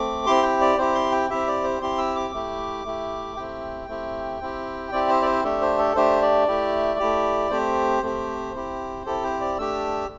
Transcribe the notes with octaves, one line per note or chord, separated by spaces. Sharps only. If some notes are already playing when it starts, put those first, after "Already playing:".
Already playing: A3 C4 D6
C4 E4 G4 C6
G5
D5
C4 E4 G4 C5
C6
G5
C4 E4 G4 E5
D5
C5
C4 E4 G4 C6
E6
D6
A3 E4 G4
A3 E4 G4
A3 C4 E4 G4 G5
A3 C4 E4 G4
C4 E4 G4
C4 E4 G4 D5
C5
D5
C5
A3 D4 G4 A4
C5
A4
A3 D4 G4 C5
D5
A3 E4 G4
A3 E4 G4
A3 C4 G4 C5
A3 C4 G4
C4 E4 G4
C4 E4 G4 A4
C5
D5
A3 D4 G4 E6